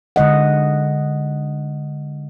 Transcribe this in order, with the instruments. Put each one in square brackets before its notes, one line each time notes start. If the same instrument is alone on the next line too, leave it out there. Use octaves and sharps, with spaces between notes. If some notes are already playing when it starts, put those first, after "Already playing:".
[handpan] D3 G#3 D#5 F#5